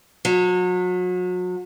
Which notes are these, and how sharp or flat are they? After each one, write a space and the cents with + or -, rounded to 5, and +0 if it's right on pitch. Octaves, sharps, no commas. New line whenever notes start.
F#3 -35